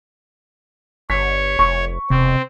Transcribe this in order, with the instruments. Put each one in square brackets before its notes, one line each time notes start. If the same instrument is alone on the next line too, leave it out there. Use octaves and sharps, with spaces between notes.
[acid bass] G1 [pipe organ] C#5 [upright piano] B6
[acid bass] F1 [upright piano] C#6
[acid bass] E1 [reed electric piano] C3 [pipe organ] C4